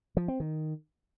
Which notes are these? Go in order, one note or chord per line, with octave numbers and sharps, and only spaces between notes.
F3
C4
D#3